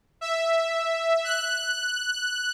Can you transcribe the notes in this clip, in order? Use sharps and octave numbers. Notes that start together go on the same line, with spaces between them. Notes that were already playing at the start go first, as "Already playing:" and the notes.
E5
F#6